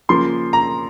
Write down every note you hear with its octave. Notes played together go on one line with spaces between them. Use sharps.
C#3 F3 A#3 C6
A#5